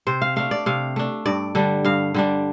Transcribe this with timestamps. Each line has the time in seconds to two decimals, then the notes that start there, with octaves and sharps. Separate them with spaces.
0.07 C3 C5
0.22 F5
0.36 A3 D4 F5
0.51 D5
0.66 C3 F5
0.96 A3 D4
1.26 G2 D5
1.55 D3 G3 D4
1.85 G2 F5
2.14 D3 G3 D4